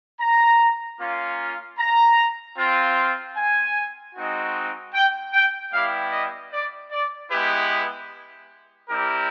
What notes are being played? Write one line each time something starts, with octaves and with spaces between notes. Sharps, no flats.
A#5
A#3 C#4 F4
A#5
C4 F4
G#5
G#3 C4 D#4 F#4
G5
G5
G3 B3 E4 G4 F5
D#5
D5
D5
G#3 B3 E4 G4 B4
G3 C4 E4 G4 A#4